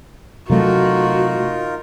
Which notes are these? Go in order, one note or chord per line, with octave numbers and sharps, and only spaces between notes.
C3 F#3 A3 D#4 F4 F#4 A#4